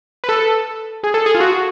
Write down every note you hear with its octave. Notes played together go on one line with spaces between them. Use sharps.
B4
A4
G#4
A4
G#4
F4
F#4